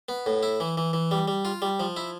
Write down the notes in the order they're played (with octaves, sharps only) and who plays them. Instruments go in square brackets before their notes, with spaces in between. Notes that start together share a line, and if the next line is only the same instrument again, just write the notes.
[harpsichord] B3
A2
E4
E3
E3
E3
G3
G3
F4
G3
F3
E4